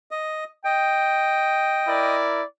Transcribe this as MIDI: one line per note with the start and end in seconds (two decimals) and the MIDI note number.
0.11 0.44 75
0.65 2.15 75
0.65 2.27 79
1.87 2.42 64
1.87 2.42 70
1.87 2.42 74